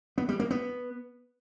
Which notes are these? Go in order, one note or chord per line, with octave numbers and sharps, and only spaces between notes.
B3
G3
A#3
B3